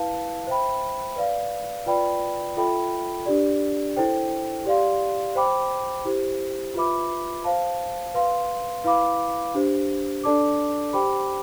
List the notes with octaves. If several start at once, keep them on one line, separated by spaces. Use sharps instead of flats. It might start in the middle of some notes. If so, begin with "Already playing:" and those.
Already playing: E4 B4 F5 A5
C5 E5 G5 B5
B4 D5 F5
F4 B4 D5 G5 B5
F4 A4 E5 G5 B5
D4 G4 D5
E4 A4 C5 G5
G4 D5 F5 C6
C5 G5 B5 D6
E4 G4 C5
F4 B4 E5 B5 D6
C5 F5 A5
B4 F5 C6
E4 B4 F5 B5 D6
D4 G4 C5
D4 A4 D5 A5 D6
G4 C5 G5 B5 D6